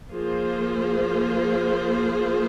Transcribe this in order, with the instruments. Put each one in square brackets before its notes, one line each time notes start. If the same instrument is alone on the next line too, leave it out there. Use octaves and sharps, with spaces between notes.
[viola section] F3 A#3 F4 G#4 C5